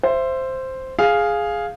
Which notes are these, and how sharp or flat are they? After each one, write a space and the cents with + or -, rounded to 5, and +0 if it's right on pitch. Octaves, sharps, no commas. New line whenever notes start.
C5 +0 E5 +25
G#4 +0 F5 +0